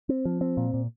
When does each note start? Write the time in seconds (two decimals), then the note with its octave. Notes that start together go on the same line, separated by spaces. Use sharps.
0.09 C4
0.25 F3
0.41 C4
0.57 A#2
0.74 A#2